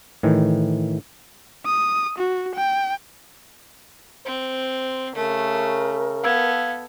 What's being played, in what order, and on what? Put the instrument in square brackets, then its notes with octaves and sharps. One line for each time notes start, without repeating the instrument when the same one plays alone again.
[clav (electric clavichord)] A2 D#3 E3
[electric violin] D#6
F#4
G5
[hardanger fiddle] C4 [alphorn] C5
[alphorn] C#3 [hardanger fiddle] A3 [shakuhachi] A#4
[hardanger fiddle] B3 A4 [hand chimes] F5 E6 G#6